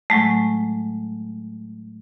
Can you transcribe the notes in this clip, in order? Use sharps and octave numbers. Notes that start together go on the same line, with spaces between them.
A2 F#3 G#3 A3